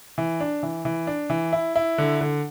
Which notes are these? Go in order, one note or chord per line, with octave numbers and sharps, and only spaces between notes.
E3
D4
E3
E3
D4
E3
E4
E4
D3
D3